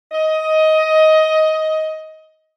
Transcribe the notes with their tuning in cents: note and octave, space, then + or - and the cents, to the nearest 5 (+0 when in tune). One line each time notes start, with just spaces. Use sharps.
D#5 +15